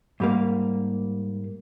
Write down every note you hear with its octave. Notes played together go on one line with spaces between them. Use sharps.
G#2 G3 A#3